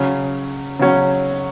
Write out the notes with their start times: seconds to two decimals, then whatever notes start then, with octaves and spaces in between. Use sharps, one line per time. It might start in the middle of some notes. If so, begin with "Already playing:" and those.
Already playing: C#3 F#3 C#4
0.79 C#3 F#3 C#4